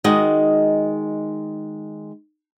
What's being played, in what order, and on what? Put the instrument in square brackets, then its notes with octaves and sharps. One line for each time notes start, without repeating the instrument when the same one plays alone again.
[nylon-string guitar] D#3 G#3 D#4 F#4 D#5